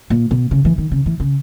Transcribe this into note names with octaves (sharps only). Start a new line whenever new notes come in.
A#2
B2
C#3
E3
D#3
C#3
E3
C#3